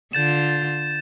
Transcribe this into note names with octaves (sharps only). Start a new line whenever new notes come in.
D3 F4 G6 A6 E7